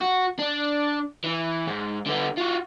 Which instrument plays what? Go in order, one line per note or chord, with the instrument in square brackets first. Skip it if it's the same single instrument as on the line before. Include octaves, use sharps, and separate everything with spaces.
[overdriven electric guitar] F#4
D4
E3
G#2
D3 B3
F4 F#4